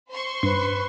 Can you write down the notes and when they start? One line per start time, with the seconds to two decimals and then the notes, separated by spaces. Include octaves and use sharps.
0.10 C5 C6 C#6
0.43 G2 B4